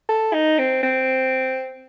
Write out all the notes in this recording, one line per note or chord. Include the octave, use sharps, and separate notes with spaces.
A4
D#4
C4
C4